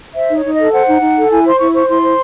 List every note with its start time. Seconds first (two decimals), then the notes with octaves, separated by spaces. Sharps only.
0.15 C5 E5
0.30 D#4 C#5
0.45 D#4
0.53 D#5
0.59 A4
0.73 C5 F#5
0.88 D#4
1.01 D#4
1.16 A4
1.30 E4 G#5
1.45 C5 C6
1.60 E4 C#6
1.74 C5 C#6
1.89 E4 C6
2.03 C5